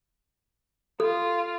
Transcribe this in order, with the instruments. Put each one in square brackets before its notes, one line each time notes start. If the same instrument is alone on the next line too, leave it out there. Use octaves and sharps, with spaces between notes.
[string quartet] F4 [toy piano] A4